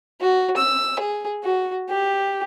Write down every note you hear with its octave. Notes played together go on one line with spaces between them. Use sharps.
F#4
E6
G#4
F#4
G4